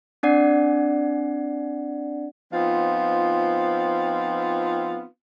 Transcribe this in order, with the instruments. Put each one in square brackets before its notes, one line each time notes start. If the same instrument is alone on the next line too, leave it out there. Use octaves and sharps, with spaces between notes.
[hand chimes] C4 D4 D5 F#5
[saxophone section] F3 B3 C4 D#4 F4